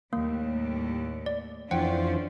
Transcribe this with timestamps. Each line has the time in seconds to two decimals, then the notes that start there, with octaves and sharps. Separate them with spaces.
0.13 D#2 A2 G3 A#3
1.26 D5
1.71 F2 E3 C#4 D4 F4 C5 F#5 G5